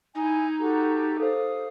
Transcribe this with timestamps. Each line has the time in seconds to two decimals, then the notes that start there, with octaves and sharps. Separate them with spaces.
0.15 D#4 E4 G#5
0.58 F#4 G4 A4
1.20 A4 C5 F5 D#6